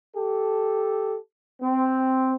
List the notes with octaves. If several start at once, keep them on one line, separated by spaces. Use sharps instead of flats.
G4 A4
C4